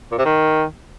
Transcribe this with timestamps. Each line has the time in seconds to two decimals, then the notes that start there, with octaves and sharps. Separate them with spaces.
0.12 A#2
0.18 C3
0.25 D#3